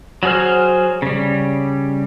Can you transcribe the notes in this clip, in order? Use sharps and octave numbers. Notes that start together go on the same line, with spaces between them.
F#3 F#4 G#4 C5 F6
C#3 G3